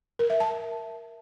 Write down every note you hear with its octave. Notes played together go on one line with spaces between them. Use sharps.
A#4
E5
A5